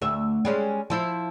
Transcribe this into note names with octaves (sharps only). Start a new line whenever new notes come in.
D2 E5
G3 G#3 C#4
F3 E4 C5